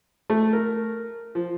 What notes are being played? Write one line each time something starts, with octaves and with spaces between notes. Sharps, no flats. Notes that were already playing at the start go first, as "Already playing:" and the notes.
A3
A#4
F3